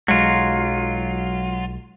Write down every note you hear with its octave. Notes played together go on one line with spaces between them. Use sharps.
B1 F#3 G#3 F4